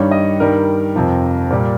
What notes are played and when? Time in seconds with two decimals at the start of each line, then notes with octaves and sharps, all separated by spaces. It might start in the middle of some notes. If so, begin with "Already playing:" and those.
Already playing: G2 D#3 G3 C#5
0.11 D#5
0.40 G2 D#3 G3 A#4
0.96 F2 C3 F3
1.51 A#2 G3